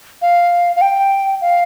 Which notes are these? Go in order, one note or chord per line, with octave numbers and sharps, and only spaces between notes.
F5
F5
G5
F5